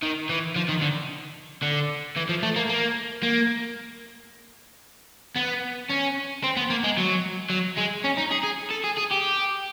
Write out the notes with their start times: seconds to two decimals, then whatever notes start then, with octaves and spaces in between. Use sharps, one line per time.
0.02 D#3
0.30 E3
0.56 F3
0.69 D#3
0.82 D3
1.62 D3
2.16 E3
2.29 F3
2.43 A3
2.56 A#3
2.69 A#3
3.23 A#3
5.36 B3
5.90 C#4
6.44 C4
6.57 B3
6.70 A#3
6.84 G#3
6.97 F#3
7.50 F#3
7.78 G#3
8.04 C#4
8.17 D#4
8.31 G#4
8.43 G#4
8.70 A4
8.84 G#4
8.97 G#4
9.11 G4